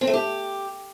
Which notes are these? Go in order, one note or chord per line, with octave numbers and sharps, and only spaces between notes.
C4
A3
G4